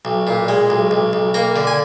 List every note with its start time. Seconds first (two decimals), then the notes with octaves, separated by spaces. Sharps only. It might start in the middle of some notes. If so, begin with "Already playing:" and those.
0.05 B1
0.27 A#2
0.48 G#3
0.70 B1
0.91 B1
1.13 B1
1.34 A#3 A#5
1.56 D3
1.67 G#5